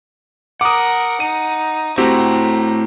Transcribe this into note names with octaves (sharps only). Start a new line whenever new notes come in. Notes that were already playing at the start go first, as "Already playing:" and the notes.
A#4 F#5 D6 D#6
D#4 D#7
A3 C4 E4 F#4 G4 A#5